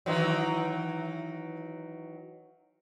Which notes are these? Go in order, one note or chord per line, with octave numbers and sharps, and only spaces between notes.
D#3 E3 F#3